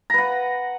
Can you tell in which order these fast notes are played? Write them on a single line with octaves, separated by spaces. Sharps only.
A#5 B4 F#5